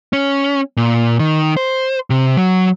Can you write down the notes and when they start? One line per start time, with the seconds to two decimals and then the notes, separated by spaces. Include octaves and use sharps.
0.13 C#4
0.77 A#2
1.19 D#3
1.57 C5
2.10 C3
2.37 F#3